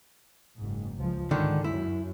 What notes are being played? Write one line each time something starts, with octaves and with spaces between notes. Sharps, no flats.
F#1 G#2
C#2 F3
G#2 D3 D#3
F#2 E4